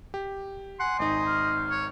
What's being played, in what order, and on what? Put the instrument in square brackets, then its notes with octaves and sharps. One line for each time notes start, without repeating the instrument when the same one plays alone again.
[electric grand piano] G4
[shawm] F#5 [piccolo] G#5 [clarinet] C6
[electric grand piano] G#1 D#4 [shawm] D#5
[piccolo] F6
[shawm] C#5